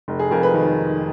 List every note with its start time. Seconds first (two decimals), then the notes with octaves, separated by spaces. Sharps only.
0.08 F1
0.19 G#4
0.31 F2 A#4
0.43 B4
0.54 D#3